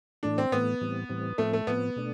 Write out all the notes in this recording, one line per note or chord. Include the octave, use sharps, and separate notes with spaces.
A2 E3 A3 D4
C4
A2 E3 A3 B3
A2 E3 G3 C4
A2 E3 G3 C4
A2 F3 A3 C4
A3
A2 F3 B3 C4
B2 A3 D4